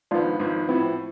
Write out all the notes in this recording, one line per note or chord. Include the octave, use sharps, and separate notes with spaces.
G#1 G#2 F3 B3 D4 F4
G#1 G#2 F3 B3
A2 F3 B3 C4 E4